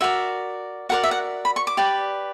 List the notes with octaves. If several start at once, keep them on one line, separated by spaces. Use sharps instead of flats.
F#4 A#4 D5 E5
F#4 A#4 D5 F#5
E5
F#5
B5
C#6
D6
G4 B4 D5